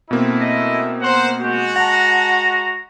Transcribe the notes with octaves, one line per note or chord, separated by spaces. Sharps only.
B2 A3 A#3 C4 E4
D#5
A#4 C5 F#5
G#3 F#4 G4
F#5 A5 A#5